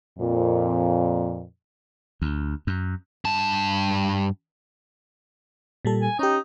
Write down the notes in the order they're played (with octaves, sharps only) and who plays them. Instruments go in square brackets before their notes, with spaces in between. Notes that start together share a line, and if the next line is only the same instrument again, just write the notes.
[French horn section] F2 A#2
[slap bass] D2
F#2
[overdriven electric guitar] G2 A5
[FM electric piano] A#2 G3 A4
[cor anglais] G#5
[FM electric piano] C#4 G4 [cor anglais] D#4